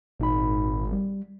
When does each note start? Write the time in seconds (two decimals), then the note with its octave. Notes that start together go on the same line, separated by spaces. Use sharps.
0.20 G#1 A#2 D#4 B5
0.92 G3